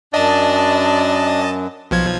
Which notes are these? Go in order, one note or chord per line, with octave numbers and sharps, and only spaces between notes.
F#2 D4 D#5 A5
B1 F3 G#6